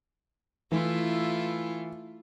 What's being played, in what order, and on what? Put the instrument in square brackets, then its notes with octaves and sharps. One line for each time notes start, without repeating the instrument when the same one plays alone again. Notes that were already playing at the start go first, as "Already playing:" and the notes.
[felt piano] E3 [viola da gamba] A3 E4 F4